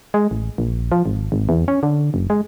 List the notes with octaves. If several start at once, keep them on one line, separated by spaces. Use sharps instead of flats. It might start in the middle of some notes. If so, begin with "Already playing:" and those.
G#3
A1
A#1
F3
G#1
G#1
E2
C#4
D3
F#1
G#3